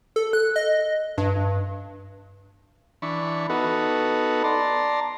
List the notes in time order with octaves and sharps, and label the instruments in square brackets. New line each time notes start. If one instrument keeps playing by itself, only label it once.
[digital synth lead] A4
F#6
D#5
G2
[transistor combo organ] E3 D4 B5 C#6
B3 D#4 F#4 A4 B4
D5 A5 A#5 C6